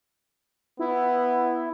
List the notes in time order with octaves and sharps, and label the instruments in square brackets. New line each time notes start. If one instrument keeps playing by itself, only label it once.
[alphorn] B3 [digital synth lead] E4